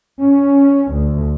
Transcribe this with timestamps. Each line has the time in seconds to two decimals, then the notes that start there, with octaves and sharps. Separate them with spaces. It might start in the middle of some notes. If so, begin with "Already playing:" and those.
0.19 C#4
0.91 D2